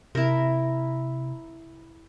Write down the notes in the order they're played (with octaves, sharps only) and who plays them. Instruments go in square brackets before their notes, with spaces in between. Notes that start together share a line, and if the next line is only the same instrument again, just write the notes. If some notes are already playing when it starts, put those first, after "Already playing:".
[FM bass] C3 [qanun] E4 A#4